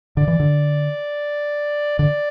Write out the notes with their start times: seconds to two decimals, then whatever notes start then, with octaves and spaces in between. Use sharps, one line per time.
0.17 D3 D5
0.28 E3
0.40 D3
1.98 D3 D5